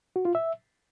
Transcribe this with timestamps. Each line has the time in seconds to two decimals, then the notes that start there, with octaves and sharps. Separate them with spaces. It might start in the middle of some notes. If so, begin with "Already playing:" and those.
0.16 F#4
0.25 F4
0.35 E5